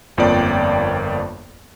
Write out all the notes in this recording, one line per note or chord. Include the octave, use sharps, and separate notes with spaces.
G1 F2 F3 A#3 D5 G5